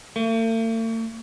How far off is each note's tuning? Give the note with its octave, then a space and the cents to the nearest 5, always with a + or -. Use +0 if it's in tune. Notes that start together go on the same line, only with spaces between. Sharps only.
A3 +45